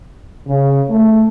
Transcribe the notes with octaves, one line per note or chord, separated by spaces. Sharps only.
C#3
A3